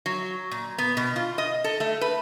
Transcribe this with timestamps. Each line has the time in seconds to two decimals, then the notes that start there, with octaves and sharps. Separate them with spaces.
0.06 F#3
0.51 A#2
0.78 B3
0.97 B2
1.16 F4
1.38 D#5
1.64 A4
1.80 A3
2.01 B4